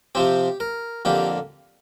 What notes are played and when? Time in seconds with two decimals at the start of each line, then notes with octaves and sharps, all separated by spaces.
0.15 C3 F3 C4 G4
0.60 A#4
1.05 F2 D3 A#3 G4